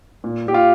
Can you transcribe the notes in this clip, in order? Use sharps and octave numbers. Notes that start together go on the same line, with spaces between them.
A#2
A#2 G4
F4